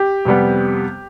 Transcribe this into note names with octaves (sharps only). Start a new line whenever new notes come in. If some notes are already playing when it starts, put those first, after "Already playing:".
Already playing: G4
F2 C3 G3 B3